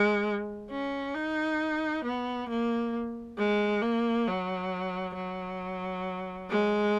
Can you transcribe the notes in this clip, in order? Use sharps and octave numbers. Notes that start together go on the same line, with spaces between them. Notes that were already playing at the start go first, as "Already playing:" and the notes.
Already playing: G#3
C#4
D#4
B3
A#3
G#3
A#3
F#3
F#3
G#3